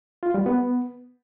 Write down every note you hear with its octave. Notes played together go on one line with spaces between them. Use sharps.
F4
G3
B3